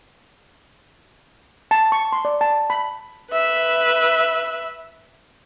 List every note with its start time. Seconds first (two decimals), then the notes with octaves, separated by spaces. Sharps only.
1.71 A5
1.92 C#6
2.13 C6
2.25 D5
2.41 A5
2.70 B5
3.32 B4 E5